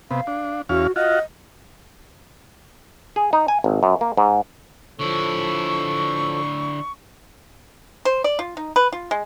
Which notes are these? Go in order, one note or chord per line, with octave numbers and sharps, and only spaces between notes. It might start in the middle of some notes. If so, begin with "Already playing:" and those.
C3 B3 F5
D4
E2 C#4 F#4 F5
F4 F#4 D#5
G#4
D#4
G#5
G#1
F#2
A#3
G#2
D3 F3 E4 A4 C#5 C#6
C5
D5
F4
D#4
B4
F4
G#3